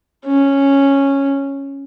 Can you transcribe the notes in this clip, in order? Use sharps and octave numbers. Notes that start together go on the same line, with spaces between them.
C#4